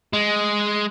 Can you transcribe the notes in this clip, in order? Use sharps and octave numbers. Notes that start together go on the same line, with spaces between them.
G#3